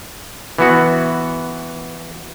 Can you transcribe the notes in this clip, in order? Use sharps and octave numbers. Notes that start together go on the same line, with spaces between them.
E3 B3 F#4